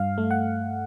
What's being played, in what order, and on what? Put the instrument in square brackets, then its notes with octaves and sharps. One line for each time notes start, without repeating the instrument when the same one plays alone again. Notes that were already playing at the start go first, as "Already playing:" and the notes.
Already playing: [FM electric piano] G2 F5
A3
F#5